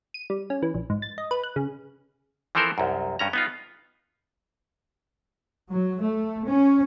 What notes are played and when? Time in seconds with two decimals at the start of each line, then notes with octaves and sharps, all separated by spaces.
0.14 D#7
0.30 G3
0.50 C#4
0.63 E3
0.74 A#1
0.90 G#2
1.02 A6
1.18 D#5
1.31 B4
1.43 F#6
1.56 C#3
2.55 E3 F3 C4 A4 A#4 C5
2.78 C2 F#2
3.19 G2 C#4 A#5
3.33 B3 D#4 F4
5.70 F#3
6.01 A3
6.48 C#4